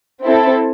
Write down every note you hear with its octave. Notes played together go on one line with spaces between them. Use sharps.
C4 E4 A4